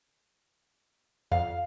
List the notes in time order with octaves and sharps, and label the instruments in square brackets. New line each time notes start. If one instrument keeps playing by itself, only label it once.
[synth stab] F2 [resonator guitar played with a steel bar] F5